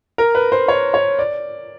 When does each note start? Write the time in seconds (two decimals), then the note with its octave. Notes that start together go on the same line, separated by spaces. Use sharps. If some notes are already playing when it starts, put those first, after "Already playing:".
0.18 A#4
0.35 B4
0.52 C5
0.68 C#5
0.94 C#5
1.19 D5